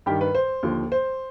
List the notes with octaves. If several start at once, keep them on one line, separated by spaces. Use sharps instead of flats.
G2 D#3 G4
B4
C5
D#2 D3 F3
C5